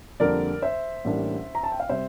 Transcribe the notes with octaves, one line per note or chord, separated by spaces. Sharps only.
F2 D3 G3 A#3 A#4 D5
C5 E5
A1 A2 G3 A#3 D4
A#5
A5
G5
F5
C3 G3 C5 E5